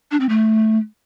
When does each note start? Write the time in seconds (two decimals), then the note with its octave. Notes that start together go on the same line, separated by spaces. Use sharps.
0.11 D4
0.20 C4
0.29 A3